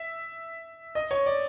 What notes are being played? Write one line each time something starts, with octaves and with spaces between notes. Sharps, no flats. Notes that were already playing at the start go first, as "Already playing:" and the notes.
Already playing: E5
D#5
C#5
D5